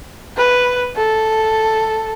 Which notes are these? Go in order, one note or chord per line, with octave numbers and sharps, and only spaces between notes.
B4
A4